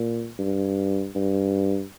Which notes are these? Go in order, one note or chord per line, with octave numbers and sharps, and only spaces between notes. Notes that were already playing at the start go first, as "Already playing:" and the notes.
Already playing: A#2
G2
G2